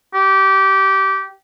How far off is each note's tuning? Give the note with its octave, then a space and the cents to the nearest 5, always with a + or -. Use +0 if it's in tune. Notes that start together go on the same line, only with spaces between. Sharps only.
G4 -20